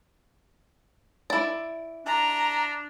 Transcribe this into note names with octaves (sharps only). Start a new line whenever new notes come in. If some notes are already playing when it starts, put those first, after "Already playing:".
E4 D5
D4 A#5